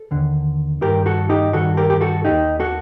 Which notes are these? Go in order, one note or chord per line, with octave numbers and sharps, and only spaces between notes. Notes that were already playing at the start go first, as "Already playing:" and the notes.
Already playing: A4
D#2 D3
G2 D#3 G4 A#4
F#4 A4
D#4 G4
G2 D#3 F#4 A4
G4 A#4
G4
F#4 A4
D#2 D#3 D#4 G4
F#4 A4